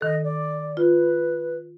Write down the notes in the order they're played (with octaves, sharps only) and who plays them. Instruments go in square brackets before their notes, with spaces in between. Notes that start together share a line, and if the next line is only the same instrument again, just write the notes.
[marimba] D#3 A4 [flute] D#5
[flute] D5
[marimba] F4 [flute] B4